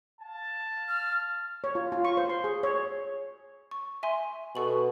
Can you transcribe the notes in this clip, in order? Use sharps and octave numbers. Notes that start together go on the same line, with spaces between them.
F5 A5
F6
C#5
F4
F4
C#6
C5
C6
G#4
C#5
C#6
E5 G#5 C6
B2 A4 C#6 F#7